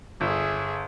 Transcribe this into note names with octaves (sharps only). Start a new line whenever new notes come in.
G1 G#4 E5